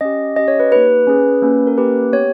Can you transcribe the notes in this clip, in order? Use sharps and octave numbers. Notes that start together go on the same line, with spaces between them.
C#4 G4 D#5
C#4 G4 D#5
C#5
B4
A#3 D#4 G4 B4
C#4 G#4
A#3 C#4 G4
A#4
A#3 C#4 G4 B4
B3 G4 C#5